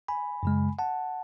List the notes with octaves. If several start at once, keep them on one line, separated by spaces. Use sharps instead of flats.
G#5 B5
F#2 C#3 G#3
F#5 A5